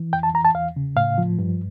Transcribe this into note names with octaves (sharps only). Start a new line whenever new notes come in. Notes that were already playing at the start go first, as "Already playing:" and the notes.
Already playing: E3
F2 G5
A5
E3 A#5
A5
E2 F5
C#3
A2 F5
F3
G2